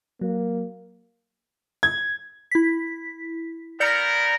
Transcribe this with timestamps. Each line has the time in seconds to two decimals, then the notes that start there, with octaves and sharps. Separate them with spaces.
0.21 F#3 A#3
1.83 G#6
2.51 E4 B6
3.80 B3 A#4 D5 G6 C#7